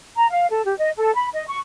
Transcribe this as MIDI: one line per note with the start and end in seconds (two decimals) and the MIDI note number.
0.16 0.26 82
0.30 0.47 77
0.51 0.64 69
0.65 0.76 67
0.78 0.90 75
0.97 1.14 69
1.15 1.28 83
1.33 1.44 75
1.48 1.58 85